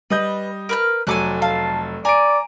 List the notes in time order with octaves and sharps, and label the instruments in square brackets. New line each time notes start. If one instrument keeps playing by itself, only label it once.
[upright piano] G3 D#5 G6 [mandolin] B4
[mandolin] A#4 B4 F6
[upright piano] F1 F#3 A4 [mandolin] G#5 D6 F#6
[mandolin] F5 [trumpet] A5
[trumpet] D5 [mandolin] G#5 [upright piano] A#5 D7